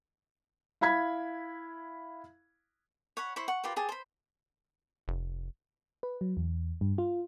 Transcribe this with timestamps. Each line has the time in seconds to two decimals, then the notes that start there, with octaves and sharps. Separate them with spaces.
0.81 E4 F5 B5 G#6 B6
3.17 C#5 F#5 B5
3.36 E4 C5 B5 C#6
3.48 F#5 C#6
3.64 F4 G4 A#4 B4
3.76 G4 G#4 A5
3.89 C5 B5
5.08 F1
6.03 B4
6.21 F#3
6.37 E2
6.81 G2
6.98 F4